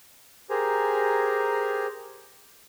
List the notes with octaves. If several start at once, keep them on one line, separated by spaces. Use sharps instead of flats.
G4 G#4 A#4 C5 G#5 A#5